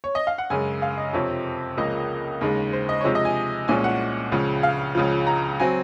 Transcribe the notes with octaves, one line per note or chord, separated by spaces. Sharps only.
C#5
D#5
F5
F#5
F#2 C#3 G#3 G#5
F5
D#5
F2 C3 F3 C4 C#5
C#2 C#3 F3 A#3 D#5
D#2 C#3 G#3
C5
D#5
C#5
C3 F3 G#3 C5
D#5
G#5
C2 A#2 F3 G#3 C#4 G#5
F#5
C#2 C#3 F3
F5
C#2 C#3 F3
A#5
F#3 C4 G#5